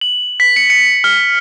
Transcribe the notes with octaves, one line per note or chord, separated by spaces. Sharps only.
F#7
B6
C#7
C#7
F6